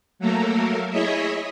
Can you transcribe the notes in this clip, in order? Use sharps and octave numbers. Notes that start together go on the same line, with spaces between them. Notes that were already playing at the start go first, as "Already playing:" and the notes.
F#3 A3 A#3 A4 A#4
E4 G#4 C#5 D#5 E5